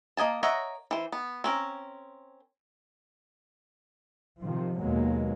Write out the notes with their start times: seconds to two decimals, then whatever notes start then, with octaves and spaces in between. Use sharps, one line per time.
0.17 A#3 D#5 G#5 A5
0.43 A#4 C#5 D#5 E5 F#5
0.91 E3 C5
1.12 B3
1.44 C4 C#4 A#4
4.40 C3 D#3 F3
4.78 D#2 B2 F#3 G#3 A#3